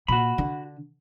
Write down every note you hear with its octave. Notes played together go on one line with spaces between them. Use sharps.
A#2 F#4 B5
D3